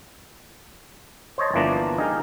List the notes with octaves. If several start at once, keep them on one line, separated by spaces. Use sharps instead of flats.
C5 C#5 D#5 A5
G1 E3 F3 A#3 D4 A#5
D#4 G4 G#4 A#4